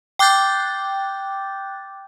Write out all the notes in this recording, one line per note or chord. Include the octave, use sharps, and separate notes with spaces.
G5 D6 F#6 G6 A6